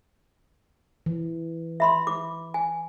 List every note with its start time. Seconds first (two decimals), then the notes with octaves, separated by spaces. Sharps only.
1.06 E3
1.80 E5 B5 C6
2.07 D6
2.54 G#5